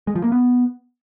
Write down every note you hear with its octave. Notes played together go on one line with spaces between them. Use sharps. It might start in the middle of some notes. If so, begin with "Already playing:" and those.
G#3
F3
A#3
B3